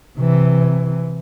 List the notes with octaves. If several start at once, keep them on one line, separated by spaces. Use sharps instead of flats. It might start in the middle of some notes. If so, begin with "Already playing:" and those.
C3 E3